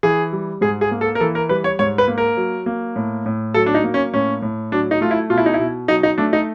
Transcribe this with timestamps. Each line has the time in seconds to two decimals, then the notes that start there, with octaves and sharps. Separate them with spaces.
0.03 E3 G#4
0.33 G3
0.61 G#2 G#4
0.81 G#4
0.91 A#3
1.01 A4
1.15 A#4
1.20 E3 A4
1.35 A#4
1.49 G3 B4
1.64 C#5
1.79 G#2 C#5
1.98 B4
2.08 A#3
2.18 A#4
2.37 F#3
2.66 A#3
2.96 A2
3.26 A2
3.54 F#3 A4
3.66 D4
3.74 D#4
3.84 A#3
3.94 C#4
4.13 A2 C#4
4.42 A2
4.72 F#3 D4
4.91 D#4
5.01 A3 F4
5.11 E4
5.30 B2 F4
5.38 E4
5.46 D#4
5.54 E4
5.59 B2
5.88 F#3 D#4
6.03 D#4
6.18 A3 D4
6.33 D#4